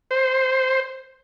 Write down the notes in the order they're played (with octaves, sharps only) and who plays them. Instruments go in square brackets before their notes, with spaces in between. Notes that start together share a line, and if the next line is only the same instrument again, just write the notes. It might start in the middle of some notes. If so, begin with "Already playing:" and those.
[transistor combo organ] C5